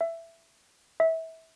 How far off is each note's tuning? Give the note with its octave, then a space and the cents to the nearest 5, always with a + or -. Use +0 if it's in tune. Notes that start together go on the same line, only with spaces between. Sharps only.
E5 +10
E5 -25